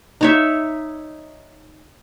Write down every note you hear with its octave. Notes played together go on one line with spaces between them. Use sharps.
D#4 C#5 E5